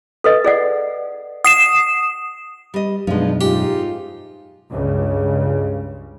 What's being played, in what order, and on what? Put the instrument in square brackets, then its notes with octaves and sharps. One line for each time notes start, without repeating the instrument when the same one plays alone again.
[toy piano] A4 B4 D#5
G#4 D5 F#5
[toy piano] F#5 [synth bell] D#6 C7 E7
[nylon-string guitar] G3 D#5
[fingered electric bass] F#2 B2 [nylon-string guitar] F3 G#3 [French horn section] B3 D4 D#4
[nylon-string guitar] G#2 [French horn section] D#4 F4 [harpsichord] G4
[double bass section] C#2 G2 C#3